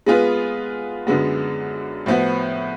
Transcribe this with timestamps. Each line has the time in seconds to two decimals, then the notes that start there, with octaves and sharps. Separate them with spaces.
0.06 G#3 B3 F4 G#4 B4
1.07 F#2 D3 G#3 B3 F#4
2.06 A2 F3 B3 F#4